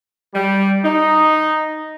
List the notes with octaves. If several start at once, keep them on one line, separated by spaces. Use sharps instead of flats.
G3
D#4